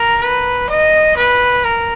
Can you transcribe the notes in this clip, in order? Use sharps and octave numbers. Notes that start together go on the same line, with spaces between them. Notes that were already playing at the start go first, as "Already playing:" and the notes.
Already playing: A#4
B4
D#5
B4
A#4